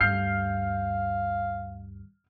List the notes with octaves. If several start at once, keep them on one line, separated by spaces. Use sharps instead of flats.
D2 G2 F5 F6 G6 C7